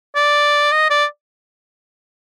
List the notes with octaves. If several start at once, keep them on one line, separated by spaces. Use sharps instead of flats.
D5
D#5
D5